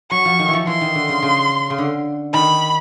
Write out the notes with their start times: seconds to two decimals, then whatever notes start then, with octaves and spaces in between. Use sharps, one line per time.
0.11 F#3 C#6
0.25 F3
0.39 D#3
0.48 E3
0.53 F3
0.67 E3 C6
0.81 D#3
0.95 D3
1.09 C#3
1.22 C#3
1.70 C#3
1.78 D3
2.34 D#3 B5